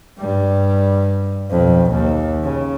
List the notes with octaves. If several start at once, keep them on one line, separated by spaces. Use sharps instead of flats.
G2 G3
B1 F2
D#2
C#3